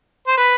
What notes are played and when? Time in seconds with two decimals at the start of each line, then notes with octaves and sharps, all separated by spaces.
0.27 C5
0.38 B4